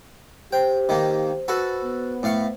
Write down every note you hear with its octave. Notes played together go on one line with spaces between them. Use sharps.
G4 C5 G5
D#3 A#3
F#4 A4 B4
B3
A2 F5 C#6